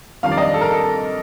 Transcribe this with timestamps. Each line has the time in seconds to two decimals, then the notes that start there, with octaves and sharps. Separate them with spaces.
0.23 F2 D#3 G3 D4 F5
0.31 D5
0.37 D#5
0.54 A4
0.61 A#4
0.71 A4